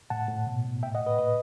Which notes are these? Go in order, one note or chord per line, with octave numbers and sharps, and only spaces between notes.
A2 F#5 A5
A2
B2
B2
A2 E5 G5
D#5 F#5
A2
B4 D#5
A2 B4 D#5